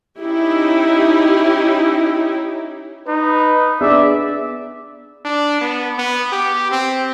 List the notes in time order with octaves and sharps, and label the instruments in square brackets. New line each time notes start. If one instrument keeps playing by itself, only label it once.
[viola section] C#4 D#4 E4 G4
[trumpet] D#4 [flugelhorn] B4
[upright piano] B3 D4 G#4 [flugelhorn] D5 [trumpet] E5
[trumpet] D4
B3
B3
G4
C4